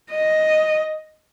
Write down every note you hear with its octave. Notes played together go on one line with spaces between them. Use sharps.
D#5